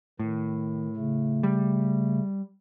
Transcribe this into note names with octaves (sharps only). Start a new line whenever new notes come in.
A2 D#3
C#3 A3
G3